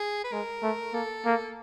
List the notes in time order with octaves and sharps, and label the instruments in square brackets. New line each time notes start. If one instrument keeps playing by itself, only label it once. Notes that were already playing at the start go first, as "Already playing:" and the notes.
Already playing: [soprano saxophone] G#4
B4
[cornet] G#3 [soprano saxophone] A#4
[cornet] A3
[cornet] A#3 [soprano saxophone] A4
[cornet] A#3